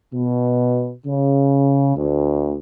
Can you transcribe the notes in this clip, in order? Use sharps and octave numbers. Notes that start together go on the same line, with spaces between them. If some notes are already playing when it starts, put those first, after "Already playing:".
B2
C#3
D2